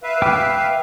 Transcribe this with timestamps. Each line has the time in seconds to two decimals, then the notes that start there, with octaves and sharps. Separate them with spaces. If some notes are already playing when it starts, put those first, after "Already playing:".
0.03 B4 E5 F5
0.22 G5 D6 F6